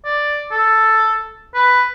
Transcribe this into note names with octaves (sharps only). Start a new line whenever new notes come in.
D5
A4
B4